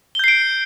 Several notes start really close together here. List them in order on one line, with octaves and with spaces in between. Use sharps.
G7 G6 C7 D7